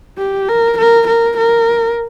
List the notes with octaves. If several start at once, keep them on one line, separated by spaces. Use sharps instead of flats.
G4
A#4
A#4
A#4
A#4